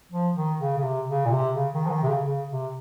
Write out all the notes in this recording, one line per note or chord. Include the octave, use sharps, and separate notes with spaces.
F3
D#3
C#3
C#3
C3
C#3
A#2
C3
C#3
D#3
F3
D#3
C3
C#3
C#3
C3